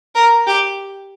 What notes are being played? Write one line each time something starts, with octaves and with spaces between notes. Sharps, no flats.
A#4
G4